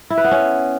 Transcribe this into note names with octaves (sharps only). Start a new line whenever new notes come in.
E4
B4
B3
C#4